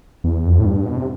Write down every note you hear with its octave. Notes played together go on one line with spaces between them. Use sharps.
E2
F2
A2
G2
B2
C3